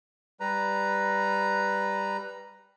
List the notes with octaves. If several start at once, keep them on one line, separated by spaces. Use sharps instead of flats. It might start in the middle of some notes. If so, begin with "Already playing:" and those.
G3 B4 A#5